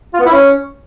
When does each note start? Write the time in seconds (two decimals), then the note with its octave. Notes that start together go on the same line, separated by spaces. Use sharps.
0.13 F4
0.19 B3
0.25 E4
0.31 C#4